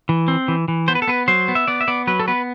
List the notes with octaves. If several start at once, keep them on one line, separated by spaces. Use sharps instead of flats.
E3
C4
E3
E3
B3 C5
B4
A4
B3 B4
F#3 C5
B3
E5
B3 D5
E5
B3 D5
F#3 B4
A4
B3 B4